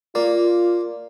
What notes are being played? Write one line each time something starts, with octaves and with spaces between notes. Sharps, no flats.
A#3 F4 D5